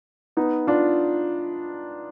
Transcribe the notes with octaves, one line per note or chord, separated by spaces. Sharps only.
B3 D#4
D4 F4